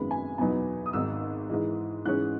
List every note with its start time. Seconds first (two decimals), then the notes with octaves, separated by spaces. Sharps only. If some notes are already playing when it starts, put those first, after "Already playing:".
Already playing: G#1 F#2 D#3 G#3 B3 B5
0.11 G#5
0.38 E2 B2 F#3 B3 D#4 G#5
0.86 D#6
0.93 G#1 G#2 D#3 E6
1.49 G#2 E3 G#3
2.05 G#2 E3 G#3 C#4 F#6